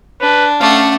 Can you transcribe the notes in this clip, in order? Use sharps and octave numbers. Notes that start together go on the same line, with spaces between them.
D4 B4
A3 C#4 F5 F#5 D6